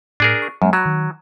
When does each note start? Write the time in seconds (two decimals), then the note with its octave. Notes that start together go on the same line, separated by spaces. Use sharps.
0.20 A2 D4 G#4 A#4
0.42 C#6
0.62 F#2 F#3 G#3 A#3
0.73 F#3 B5
0.86 D#3